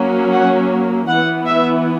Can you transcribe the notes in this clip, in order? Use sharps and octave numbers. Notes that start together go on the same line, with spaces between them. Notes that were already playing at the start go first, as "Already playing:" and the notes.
Already playing: F#3 A#3 C#4
F#5
E3 B3 F#5
E5